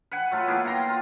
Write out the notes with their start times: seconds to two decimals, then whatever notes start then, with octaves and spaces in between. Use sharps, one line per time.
0.11 B4 F#5 G#5
0.31 F#3 A3 F4
0.47 A#3 B3 E4 G#4
0.65 F5 G5 A#5 C6
0.88 F4